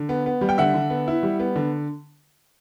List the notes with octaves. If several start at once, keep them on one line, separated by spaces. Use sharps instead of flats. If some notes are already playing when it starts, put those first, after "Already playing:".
Already playing: D3
B3
B3
G3
G5
D3 E5 F#5
D3
B3
E4
G3
B3
D3